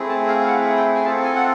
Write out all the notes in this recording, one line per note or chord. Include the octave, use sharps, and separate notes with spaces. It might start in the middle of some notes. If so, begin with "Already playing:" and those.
Already playing: A3 C4 E4 G#4
A5
F5
F5
F#5
G5
G#5
C4 F4 A4 A5
G#5
F#5